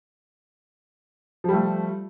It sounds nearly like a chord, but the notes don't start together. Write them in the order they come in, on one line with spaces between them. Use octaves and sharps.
F3 G3 A3